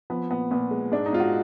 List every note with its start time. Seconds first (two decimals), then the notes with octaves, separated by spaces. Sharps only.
0.10 F3 B3
0.31 A#2 B3
0.51 A#2 B3
0.71 G#3
0.92 G#2 D4
1.06 D#4
1.13 G#2 F4
1.20 F#4